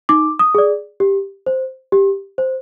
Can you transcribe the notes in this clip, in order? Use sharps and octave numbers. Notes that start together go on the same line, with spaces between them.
D#4 D6
D#6
G#4 D5
G4
C5
G4
C5